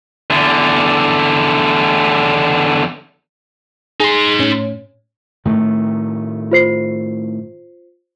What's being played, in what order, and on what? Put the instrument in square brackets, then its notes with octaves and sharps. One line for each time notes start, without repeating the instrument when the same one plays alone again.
[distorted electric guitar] E2 D3
[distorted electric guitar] D#4 C6 [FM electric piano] G#4
[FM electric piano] A2 C#4
[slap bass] A2 D#3 A3
[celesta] F4 C5 C7